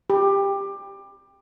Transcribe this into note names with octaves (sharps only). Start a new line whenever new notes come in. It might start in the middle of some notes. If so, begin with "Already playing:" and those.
G4